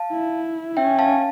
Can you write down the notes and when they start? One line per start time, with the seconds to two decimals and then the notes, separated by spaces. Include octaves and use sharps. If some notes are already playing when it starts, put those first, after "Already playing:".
Already playing: F5 A5
0.11 E4
0.77 C#4 E5 G5
0.99 F5 A5